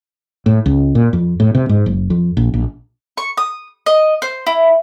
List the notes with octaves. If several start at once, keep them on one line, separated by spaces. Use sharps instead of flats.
A2
C#2
A#2
F2
A2
C3
G#2
F#1
F2
A#1
A#1
C#6
D#6
D#5
C5
E4